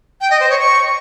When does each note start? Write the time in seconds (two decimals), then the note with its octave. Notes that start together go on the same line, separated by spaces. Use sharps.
0.21 G5
0.30 D#5
0.40 C5
0.50 C#5
0.60 C#6